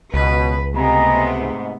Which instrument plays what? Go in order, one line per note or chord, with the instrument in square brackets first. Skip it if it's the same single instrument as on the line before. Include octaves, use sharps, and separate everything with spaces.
[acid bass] C#2 [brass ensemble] B2 [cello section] B4
[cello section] C3 A3 B3 [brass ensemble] D#5 G#5 A#5
[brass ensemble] G#2